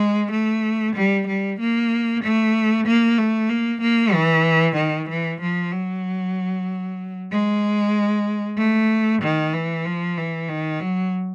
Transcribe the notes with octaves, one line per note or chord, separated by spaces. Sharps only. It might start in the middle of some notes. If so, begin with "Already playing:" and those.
Already playing: G#3
A3
G3
G3
A#3
A3
A#3
A3
A#3
A#3
E3
D#3
E3
F3
F#3
G#3
A3
D#3
E3
F3
E3
D#3
F#3